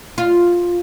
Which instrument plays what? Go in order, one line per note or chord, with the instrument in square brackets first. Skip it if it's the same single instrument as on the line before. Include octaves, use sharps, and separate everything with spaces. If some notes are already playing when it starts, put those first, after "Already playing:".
[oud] F4